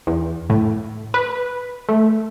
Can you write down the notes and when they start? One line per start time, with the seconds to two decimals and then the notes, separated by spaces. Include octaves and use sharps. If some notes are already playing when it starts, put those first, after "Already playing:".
0.07 E2
0.50 A2
1.14 B4
1.89 A3